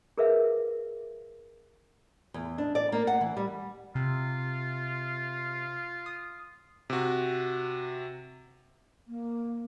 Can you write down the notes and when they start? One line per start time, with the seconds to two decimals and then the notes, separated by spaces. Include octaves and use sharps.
0.18 G#4 A#4 B4 E5 F5
2.34 E2
2.58 D4
2.75 D5
2.92 A#3
3.07 F#5
3.21 E3
3.37 G3
3.95 C3 F4
6.06 D#6
6.90 C3 F#4
9.06 A#3